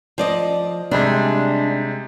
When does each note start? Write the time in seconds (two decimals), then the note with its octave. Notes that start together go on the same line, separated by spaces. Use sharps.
0.18 F3 D5 D#5
0.91 C3 G3 G#3 D4